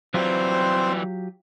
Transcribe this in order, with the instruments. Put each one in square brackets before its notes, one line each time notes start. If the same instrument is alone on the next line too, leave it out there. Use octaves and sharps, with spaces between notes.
[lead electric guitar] E3 G3 [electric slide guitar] F#3 F4 G4 [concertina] C4 C5